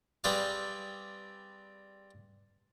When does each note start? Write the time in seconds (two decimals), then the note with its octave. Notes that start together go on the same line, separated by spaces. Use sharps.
0.24 G3 C4 G#4 B4 D5 F5